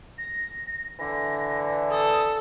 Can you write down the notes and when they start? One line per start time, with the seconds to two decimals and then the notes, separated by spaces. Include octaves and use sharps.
0.18 A#6
0.99 D3 E3 A#6
1.91 A4 D#6